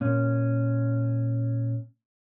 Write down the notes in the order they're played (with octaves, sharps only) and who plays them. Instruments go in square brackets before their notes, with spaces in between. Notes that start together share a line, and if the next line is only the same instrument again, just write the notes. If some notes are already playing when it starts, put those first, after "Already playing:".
[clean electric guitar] A#2 C#4